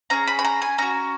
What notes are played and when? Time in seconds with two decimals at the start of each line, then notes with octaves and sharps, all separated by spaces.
0.10 C#4 G#4 A#5
0.27 B5
0.39 B5
0.44 A#5
0.62 G#5
0.78 C#4 F#4 A#5